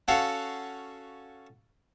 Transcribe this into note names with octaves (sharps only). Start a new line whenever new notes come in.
C#4 F#4 A4 F5 F#5